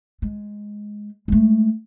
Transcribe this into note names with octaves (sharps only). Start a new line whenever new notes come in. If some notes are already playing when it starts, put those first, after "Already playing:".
G#3
G#3 A3